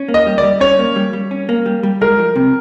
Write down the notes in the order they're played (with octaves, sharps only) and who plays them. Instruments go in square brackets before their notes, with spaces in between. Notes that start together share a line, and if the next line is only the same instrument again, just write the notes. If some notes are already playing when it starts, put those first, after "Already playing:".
Already playing: [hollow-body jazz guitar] C#4
A#3
[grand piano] D#5
[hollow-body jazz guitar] G3
[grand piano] D5
[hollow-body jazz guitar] G3
[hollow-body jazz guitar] C#4 [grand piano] C#5
[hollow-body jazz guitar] A#3
G3
G3
C#4
A#3
G3
G3
[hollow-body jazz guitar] G#3 [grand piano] A#4
[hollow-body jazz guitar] F3
C3